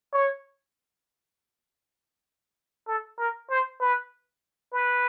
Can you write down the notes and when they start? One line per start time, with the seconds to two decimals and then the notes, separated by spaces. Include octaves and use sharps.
0.13 C#5
2.88 A4
3.19 A#4
3.50 C5
3.80 B4
4.72 B4